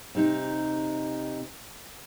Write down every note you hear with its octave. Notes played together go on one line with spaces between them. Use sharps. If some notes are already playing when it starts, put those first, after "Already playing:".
C3 D#4